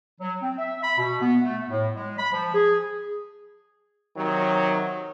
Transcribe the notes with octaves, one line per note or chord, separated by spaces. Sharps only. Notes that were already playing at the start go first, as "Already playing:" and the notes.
F#3
C4
E5
B5
B2
B3
A3
A2
G#3
B5
F3
G#4
C3 D#3 F#3